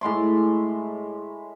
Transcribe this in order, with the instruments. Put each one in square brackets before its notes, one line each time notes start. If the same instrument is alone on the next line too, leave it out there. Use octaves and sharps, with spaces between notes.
[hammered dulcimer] A2 G#3 C6 D6